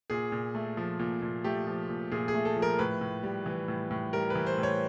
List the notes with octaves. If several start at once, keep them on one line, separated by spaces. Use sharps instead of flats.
A#2 G#4
A#2
A3
F3
A#2
A#2
A3 G4
F3
A#2
A#2 G#4
G#4
A3
A4
F3
A#4
A2 B4
A2
G3
E3
A2
A2
G3 A#4
B4
E3
C5
A2
C#5